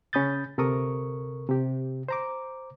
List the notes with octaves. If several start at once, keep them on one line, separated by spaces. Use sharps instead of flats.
C#3 C#4 B5 D#6 G6 A6
D2 C3 A4 A#4 C#6 D#6
C3 G4
C5 A#5 D6